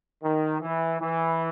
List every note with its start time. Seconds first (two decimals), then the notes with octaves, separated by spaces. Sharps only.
0.23 D#3
0.61 E3
1.00 E3